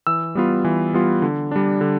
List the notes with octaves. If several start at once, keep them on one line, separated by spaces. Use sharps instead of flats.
E3 E6
G3 B3 F4
E3
G3 B3 F4
D3
G3 D4
D3